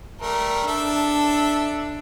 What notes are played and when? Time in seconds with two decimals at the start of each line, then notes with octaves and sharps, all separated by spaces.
0.21 G3 A3 A#4
0.67 D4 A4 E5